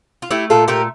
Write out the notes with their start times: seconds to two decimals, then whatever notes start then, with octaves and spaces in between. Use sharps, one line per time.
0.22 F4
0.30 A3 E4 G4
0.50 A#2 F4 A4
0.68 A3 G4 A#4